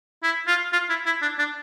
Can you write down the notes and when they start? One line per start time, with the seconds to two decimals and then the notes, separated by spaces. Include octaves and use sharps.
0.23 E4
0.47 F4
0.73 F4
0.89 E4
1.06 E4
1.22 D4
1.39 D4